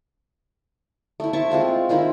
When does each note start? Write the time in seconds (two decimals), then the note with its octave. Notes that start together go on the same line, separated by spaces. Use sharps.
1.20 A3 E4
1.33 E4 C5 A5 C#6
1.50 G#3 C4 F4 A4
1.89 D#3 E4 F4 C5